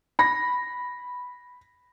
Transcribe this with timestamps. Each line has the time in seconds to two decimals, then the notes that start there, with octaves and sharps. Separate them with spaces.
0.19 B5 A#6